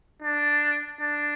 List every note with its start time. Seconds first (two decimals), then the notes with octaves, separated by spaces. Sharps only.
0.23 D4
1.01 D4